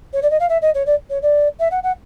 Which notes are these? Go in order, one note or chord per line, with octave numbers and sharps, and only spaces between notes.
C#5
D5
D#5
F5
E5
D#5
C#5
D5
C#5
D5
E5
F#5
F#5